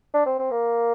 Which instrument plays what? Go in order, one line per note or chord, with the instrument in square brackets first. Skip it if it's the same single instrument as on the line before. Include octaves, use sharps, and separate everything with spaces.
[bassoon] D4
C4
C4
A#3